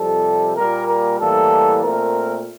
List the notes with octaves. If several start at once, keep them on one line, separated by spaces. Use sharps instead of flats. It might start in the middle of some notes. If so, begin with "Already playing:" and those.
Already playing: F2 C3 G3 A4
A#2 G3 A#3 A#4
A#4
A2 E3 G3 A#3 A4
A#2 A3 C4 A#4